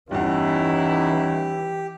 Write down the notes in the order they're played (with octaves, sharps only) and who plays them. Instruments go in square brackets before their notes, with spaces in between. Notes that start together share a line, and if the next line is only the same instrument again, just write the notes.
[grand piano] G1 E2 [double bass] E3 [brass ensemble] C#4 D#4 E4 [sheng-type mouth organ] G4